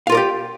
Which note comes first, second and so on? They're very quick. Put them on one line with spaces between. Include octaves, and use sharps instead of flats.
F5 F4 A#4 D5 G4